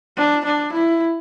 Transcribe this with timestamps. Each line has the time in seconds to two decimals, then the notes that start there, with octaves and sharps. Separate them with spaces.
0.17 D4
0.45 D4
0.73 E4